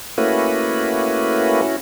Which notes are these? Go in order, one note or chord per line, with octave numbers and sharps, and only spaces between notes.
A3 A#3 C#4 E4 F#4 B4
C#4 E4 F#4